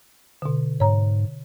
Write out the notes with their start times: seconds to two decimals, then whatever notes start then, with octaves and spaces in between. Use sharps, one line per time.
0.42 B2 D3
0.80 G#2 C#5 A#5